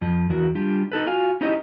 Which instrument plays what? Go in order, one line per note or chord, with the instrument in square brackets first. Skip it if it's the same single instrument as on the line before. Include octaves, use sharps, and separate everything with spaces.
[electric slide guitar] F2 F3
E2 E3 F#4 A#4
G3 D4 F4 G4
D#4 A4 B4
F4 F#4 F5 G#5
C#4 D#4 E4 G4 C5 D#5